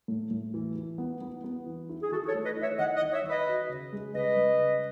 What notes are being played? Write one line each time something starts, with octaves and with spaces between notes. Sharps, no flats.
A2
A2
E3
E3
B3
B3
B3
E3
E4
G#4
D#3 F#4 A4
A4 C#5
A3
B4 D#5
E4
C#5 E5
D#3 D#5 F#5
D#5 F#5
D#3
C#5 E5
D#3
B4 D#5
F#4
C#3
G#3
C#3 B4 D#5
G#3
C#3